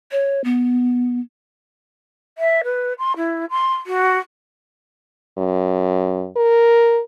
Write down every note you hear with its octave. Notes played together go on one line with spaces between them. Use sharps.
C#5
B3
E5
B4
C6
E4
C6
F#4
F#2
A#4